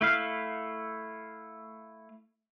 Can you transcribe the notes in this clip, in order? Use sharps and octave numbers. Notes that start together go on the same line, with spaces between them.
A3 E4 F5